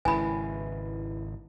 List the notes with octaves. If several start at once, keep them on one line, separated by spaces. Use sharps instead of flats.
G#1 C#3 E4 B4 G#5 B5